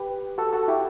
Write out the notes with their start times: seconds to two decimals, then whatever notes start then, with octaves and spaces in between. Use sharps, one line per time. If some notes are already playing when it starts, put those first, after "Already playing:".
Already playing: G4 B4
0.38 F#4 A4
0.53 F#4 A4
0.68 E4 G4